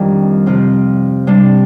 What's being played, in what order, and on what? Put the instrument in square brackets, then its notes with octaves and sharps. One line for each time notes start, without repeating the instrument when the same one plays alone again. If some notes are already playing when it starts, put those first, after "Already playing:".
Already playing: [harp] F2 D#3 G3 D4 F4
C3 F3 C4
C3 G3 D4